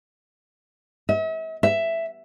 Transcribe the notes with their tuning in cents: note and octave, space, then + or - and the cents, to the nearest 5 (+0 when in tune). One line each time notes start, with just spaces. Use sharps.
E5 -45
E5 +5